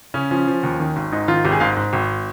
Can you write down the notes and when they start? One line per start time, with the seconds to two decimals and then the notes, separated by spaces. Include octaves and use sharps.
0.14 C#3 C#4
0.31 F3 C#4
0.47 F3
0.63 D#2
0.80 D#3
0.96 G#1
1.12 G#2 D#4
1.28 D#3 F4
1.44 G#1 G4
1.52 G#4
1.60 G#2 F5
1.77 G#2
1.93 G#1